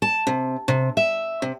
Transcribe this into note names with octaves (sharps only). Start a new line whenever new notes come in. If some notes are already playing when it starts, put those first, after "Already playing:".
A5
C3
C3
E5
C3